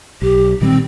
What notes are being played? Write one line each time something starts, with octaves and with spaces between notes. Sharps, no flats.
B1 G4
A#2 D#3 G3 C4